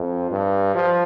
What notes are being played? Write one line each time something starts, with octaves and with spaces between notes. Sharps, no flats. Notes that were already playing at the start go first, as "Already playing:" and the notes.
Already playing: F2
G2
F3